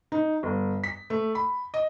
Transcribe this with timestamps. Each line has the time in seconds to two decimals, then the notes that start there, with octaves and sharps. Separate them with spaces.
0.12 D#4
0.43 G1
0.84 B6
1.10 A3
1.35 B5
1.74 D#5